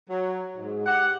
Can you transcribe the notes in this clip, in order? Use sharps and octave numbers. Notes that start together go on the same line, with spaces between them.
F#3
G#2
G4 F#5